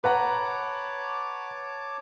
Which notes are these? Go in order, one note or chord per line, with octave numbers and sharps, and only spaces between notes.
B4 C#5 F#5 A5 A#5 D6